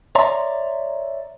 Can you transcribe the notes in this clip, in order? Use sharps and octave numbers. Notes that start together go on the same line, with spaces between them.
C#5 D5 E5 A#5 C6